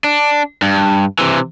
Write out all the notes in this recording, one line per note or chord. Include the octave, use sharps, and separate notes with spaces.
D4
G2
C3 E3